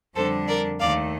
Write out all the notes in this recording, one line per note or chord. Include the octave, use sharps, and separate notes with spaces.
F2 D3 G3 D4 A4 C5
A#4 D5
D#2 D#3 A3 D5 F5